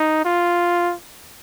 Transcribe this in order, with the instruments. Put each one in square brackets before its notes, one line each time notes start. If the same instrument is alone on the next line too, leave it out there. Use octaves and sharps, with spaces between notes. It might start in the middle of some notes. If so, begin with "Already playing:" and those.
Already playing: [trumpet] D#4
F4